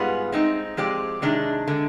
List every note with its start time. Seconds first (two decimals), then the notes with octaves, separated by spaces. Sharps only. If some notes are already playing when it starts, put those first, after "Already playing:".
Already playing: G#2 G3 B3 F4 G#4
0.32 G#3 C4 D#4
0.77 F3 G#3 C4 G4 D5
1.22 C3 D#3 G#3 D4 G#4
1.68 D3 G#3